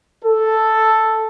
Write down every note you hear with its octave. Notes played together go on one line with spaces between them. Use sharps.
A4